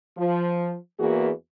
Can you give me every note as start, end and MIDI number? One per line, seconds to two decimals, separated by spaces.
0.17 0.76 53
0.99 1.31 40
0.99 1.31 52
0.99 1.31 58
0.99 1.31 66
0.99 1.31 68